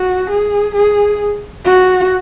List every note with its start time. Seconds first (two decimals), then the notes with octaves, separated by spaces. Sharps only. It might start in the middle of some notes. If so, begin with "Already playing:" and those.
Already playing: F#4
0.31 G#4
0.75 G#4
1.65 F#4